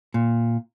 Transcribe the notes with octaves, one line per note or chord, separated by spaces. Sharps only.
A#2